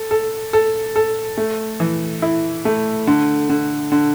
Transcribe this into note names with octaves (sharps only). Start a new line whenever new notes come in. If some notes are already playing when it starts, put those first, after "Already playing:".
Already playing: A4
A4
A4
A4
A3
E3
E4
A3
D3
D3
D3